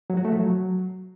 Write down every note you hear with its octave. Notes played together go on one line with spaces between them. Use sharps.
F#3
F#4
A3
F3
F#3